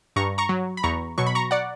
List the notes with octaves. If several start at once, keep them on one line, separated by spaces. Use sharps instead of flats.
G2 A#5 C#6
A#5 C#6
F#3
B5
E2 A#5 C#6
B2 F#3 C#6
B5
A#5 C#6
D5 F#5